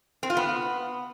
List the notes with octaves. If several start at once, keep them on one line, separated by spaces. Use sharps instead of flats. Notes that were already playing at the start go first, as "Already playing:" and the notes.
C4
F4
B3